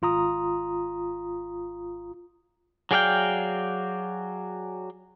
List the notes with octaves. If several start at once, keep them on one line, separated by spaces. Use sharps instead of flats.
G#1 F4 A#5 D#6
F#3 G#4 D5 F5 G5